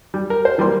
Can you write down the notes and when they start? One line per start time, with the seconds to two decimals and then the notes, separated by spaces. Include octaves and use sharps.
0.14 G3
0.30 A#4
0.45 C5
0.58 E3 G3 A#3 C4 C6